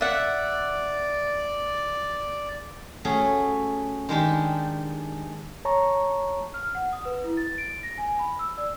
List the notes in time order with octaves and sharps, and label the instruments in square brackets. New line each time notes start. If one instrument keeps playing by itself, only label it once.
[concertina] D5 [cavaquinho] E5 F#5
[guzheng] A3 C#4 F#4 G#4
D#3 G#3 D4 G4
[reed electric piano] C#5 A5 A#5 C#6
[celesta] F6
F#5
D#6
B4
E4
A6
D7
A#6
G#5
B5
E6
D5